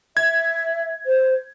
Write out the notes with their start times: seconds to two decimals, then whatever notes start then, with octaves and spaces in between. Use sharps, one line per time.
0.17 E5 G#6
1.06 C5